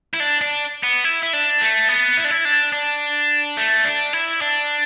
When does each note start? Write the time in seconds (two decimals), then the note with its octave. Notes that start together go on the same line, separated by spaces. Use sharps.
0.14 E4
0.20 D4
0.41 D4
0.83 B3
1.04 E4
1.23 E4
1.33 D4
1.61 A3
1.89 B3
2.17 E4
2.24 D4
2.31 E4
2.45 D4
2.72 D4
3.57 A3
3.85 D4
4.13 E4
4.41 D4